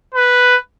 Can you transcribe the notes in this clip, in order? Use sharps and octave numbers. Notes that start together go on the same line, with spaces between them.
B4